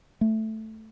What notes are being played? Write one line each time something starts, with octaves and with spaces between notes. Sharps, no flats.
A3